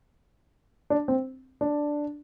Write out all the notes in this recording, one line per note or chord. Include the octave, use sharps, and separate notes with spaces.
D4
C4
D4